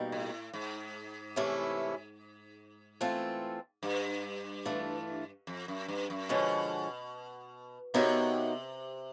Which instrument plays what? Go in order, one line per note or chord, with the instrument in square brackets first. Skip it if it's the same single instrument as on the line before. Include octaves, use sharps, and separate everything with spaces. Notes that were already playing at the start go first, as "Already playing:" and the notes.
Already playing: [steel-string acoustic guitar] B2 G3 A#3 D#4
[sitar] A2
G#2
[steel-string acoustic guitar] C3 E3 A3 C#4 E4
E3 A3 C4 F4 A4
[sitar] G2
[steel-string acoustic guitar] E3 A3 D4 F4
[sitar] F2
F#2
G2
F#2
[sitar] B2 [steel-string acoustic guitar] D3 F3 G#3 C#4
[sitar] C3 [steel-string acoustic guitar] B3 D#4 F#4 A#4 C#5